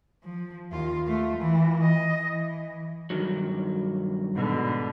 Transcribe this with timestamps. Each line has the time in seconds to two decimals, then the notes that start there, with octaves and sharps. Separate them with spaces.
0.23 F3
0.72 D#2 F4
1.05 A3 F4
1.38 E3
1.82 D#5
2.21 E3
3.10 G2 D#3 F#3
4.33 G#2 B2 D3